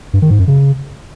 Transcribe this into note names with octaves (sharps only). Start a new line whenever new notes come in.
G2
D#3
G#2
F#2
C#3